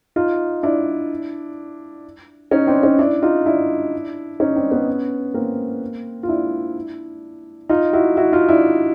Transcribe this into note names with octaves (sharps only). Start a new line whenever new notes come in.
D#4 F4
D4 E4
C#4 D#4
C4 D4
C#4 D#4
D4 E4
D#4 F4
D4 E4
C#4 D#4
C4 D4
B3 C#4
A#3 C4
F4
D4 E4
D#4 F4
E4 F#4
E4 F#4
D#4 F4
D4 E4